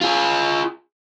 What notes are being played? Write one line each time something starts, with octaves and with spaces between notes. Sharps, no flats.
F4 G#4